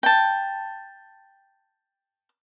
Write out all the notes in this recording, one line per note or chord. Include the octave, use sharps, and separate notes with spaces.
G5 A5